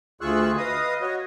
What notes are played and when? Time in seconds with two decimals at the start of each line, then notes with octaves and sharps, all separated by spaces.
0.21 D2 F4 G#4 C#6 E6 F#6
0.58 B4 D#5 F5 D#6
1.02 F#4 C#5 D#5